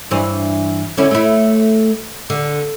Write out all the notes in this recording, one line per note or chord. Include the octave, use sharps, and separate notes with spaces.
G2 E3 C5
D3 C#4 E4
A3 E4
D3